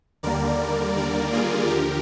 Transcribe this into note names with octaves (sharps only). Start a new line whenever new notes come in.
D#2 D3 G3 A#3 A#4 D5
A#4 D5
F4 G#4
D#2 D3 F3 G4 A#4